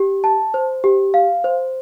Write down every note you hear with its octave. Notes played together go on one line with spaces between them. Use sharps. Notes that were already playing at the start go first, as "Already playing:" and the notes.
Already playing: G4
A5
C5
G4
F5
C5